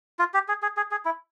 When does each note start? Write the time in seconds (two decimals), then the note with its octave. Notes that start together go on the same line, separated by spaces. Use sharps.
0.19 F4
0.34 G4
0.48 G#4
0.62 G#4
0.77 G#4
0.91 G#4
1.05 E4